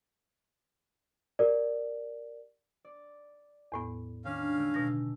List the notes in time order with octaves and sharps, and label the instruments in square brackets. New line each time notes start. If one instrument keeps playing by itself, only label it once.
[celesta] G4 A#4 D5
[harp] D5
[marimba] E2 A2 B3
[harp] D#3 D4 [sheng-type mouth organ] C#4 F5
[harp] D3 G#3 A3
[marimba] B2 A#6 [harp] G#3 G6